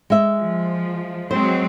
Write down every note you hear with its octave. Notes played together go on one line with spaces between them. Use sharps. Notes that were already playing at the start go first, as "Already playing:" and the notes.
G#3 E5
F3
F#3 G#3 C4 C5